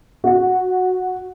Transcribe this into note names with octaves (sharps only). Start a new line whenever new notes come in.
F#4